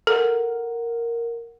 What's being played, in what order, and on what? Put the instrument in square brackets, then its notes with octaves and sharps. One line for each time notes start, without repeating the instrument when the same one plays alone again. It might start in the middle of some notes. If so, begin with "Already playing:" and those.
[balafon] A4 [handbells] A#4 F#5